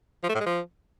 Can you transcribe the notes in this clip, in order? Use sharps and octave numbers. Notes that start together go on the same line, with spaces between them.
F3
A3
A2
G#3
F3